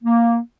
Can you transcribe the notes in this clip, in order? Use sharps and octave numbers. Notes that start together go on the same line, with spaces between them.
A#3